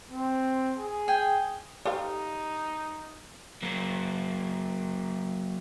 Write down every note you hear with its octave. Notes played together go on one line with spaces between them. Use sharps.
C4
G#4
G5 G#5
D#4 G4 A4 C5 D5 F5
F#3 A#3